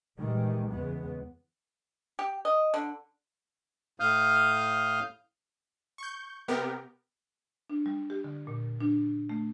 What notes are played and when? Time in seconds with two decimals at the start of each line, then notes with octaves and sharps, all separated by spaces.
0.17 A#2 D#3 E3 G3 G#3
0.72 E2 C#3 G#3 B3
2.19 G4
2.45 D#5
2.74 D3
4.00 A2 F5 D#6 F6 G6
5.98 C#6 G6
6.48 C3 B3 G4 A#4
7.70 D4
7.86 G3
8.10 G4
8.24 D3
8.47 A#2
8.81 D4
9.29 A3